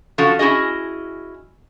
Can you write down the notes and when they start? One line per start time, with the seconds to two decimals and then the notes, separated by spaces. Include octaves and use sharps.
0.18 F3 C#4 F#4 A4
0.39 C#4 E4 F#4 G#4 D#5